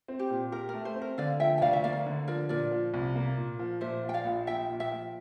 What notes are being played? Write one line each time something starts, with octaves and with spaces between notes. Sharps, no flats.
C4
G4
A#2
G4 A#4
A#4
A3
C5
C4
A#4
D3 D5 F5
F3 E5 G5
G5
D2 D5 F5
E5
A#3 D5 F5
D3
F3 A#4 D5
A#2 A#4 D5
F3
C2
A#3
A#2
F3
A#2 C5 E5
F3
G5
D5 F5
A#1
A#1 E5 G5
A#2
E5 G5
F3